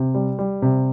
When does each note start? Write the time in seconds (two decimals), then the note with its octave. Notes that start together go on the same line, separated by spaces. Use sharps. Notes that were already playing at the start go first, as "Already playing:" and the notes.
Already playing: C3
0.15 G3
0.39 G3
0.62 C3